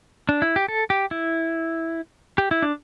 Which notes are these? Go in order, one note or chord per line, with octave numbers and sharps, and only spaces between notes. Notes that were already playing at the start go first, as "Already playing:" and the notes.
D4
E4
G4
A4
G4
E4
G4
E4
D4